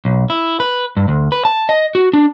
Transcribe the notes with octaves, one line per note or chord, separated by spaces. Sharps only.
B1
E4
B4
G2
D2
B4
A5
D#5
F#4
D4